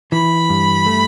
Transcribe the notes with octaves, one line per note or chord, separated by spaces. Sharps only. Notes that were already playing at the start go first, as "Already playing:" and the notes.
E3 B5
G2
A3